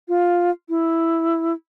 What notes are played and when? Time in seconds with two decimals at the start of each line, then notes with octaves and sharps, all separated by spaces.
0.08 F4
0.69 E4